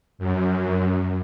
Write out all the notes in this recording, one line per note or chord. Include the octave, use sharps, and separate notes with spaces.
F#2